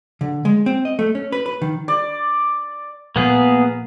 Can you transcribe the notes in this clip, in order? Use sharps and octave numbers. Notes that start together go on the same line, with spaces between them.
D3
G#3
C4
D#5
A3
C#4
B4
B4
D#3
D5
A#2 A#3 B3 G#4